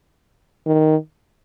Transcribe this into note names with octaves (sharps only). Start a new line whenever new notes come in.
D#3